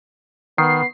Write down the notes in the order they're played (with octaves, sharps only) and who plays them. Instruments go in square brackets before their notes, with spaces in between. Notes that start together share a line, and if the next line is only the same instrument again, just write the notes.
[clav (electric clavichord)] D#3 [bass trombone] B3 [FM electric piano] C7